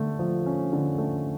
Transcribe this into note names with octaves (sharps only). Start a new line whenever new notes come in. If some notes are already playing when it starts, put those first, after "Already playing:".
Already playing: D3 A3
F3
C#4
D3
A3